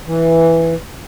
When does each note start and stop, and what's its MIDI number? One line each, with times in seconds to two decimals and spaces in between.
0.07 0.75 52